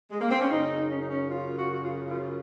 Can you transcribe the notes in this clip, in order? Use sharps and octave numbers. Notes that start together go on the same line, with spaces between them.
G#3
A#3
C4
C#4
F#2 C#3 D#4
C#4
D#4
C#4
F4
F#4
F#4
F4
F4